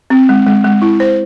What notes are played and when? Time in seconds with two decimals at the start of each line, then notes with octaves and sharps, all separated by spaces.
0.10 C4
0.29 G#3
0.47 G#3
0.64 G#3
0.82 E4
1.00 C5